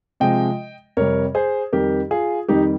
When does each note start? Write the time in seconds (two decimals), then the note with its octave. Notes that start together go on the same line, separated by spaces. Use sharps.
0.20 C3 F3 G#3 D#5 G5
0.97 F2 C3 G3 A#4 C#5
1.35 G#4 C5
1.73 F2 D#3 G3 G4 A#4
2.11 F4 G#4
2.49 F2 D#3 G3 D#4 G4